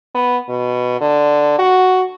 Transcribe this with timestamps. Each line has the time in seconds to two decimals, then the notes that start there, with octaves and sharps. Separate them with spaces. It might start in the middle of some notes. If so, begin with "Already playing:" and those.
0.15 B3
0.49 B2
1.01 D3
1.59 F#4